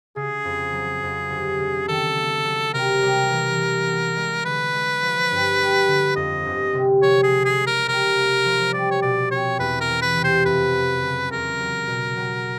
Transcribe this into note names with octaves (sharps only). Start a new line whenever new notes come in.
C#3 G#4
F2
F#3
F2
G1
C#3
D#3 A4
A#3
F#3
C3 A#4
G3
E3
E3
B3
G#3
D3 B4
G#3
F3
G2
G3
D3
F2 D#5
G1
C3
F3 C#5
G#4
C#3
G#4
G#3
A#4
C3 A#4
A#3
F3
G3 D5
C#5
B2 D5
C4 C#5
E2 B4
A#4
E3
B4
C3
C5
F2 B4
F#3
C#3
E2 A#4
F#3
B2
F#3